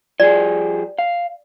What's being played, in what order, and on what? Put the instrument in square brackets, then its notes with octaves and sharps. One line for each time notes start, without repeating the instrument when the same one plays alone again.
[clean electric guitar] F3 G3 G#4 [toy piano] D5
[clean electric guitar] F5